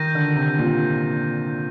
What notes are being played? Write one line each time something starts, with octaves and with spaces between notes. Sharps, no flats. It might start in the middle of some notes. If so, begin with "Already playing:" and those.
Already playing: D#3 G6 A#6 D#7
D3
C3
A#2